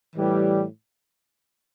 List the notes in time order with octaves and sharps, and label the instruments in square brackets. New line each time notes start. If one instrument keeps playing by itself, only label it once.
[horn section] A2 E3 G3